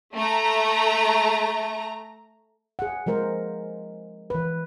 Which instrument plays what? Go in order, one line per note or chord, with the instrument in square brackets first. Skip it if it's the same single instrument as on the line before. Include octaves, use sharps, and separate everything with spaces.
[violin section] A3 A#5
[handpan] G#4 F#5
F3 G#3 A#4 C5
E3 B4